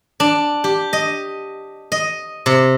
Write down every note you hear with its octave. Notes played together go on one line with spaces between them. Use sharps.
D4
G4
D#5
D#5
C3